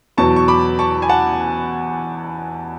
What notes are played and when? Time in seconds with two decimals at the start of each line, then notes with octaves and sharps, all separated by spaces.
0.18 E2 B2 F#3 A5 C#6
0.36 C#6
0.48 B5 D6
0.79 A5 C#6
1.02 G#5
1.09 F#5 A5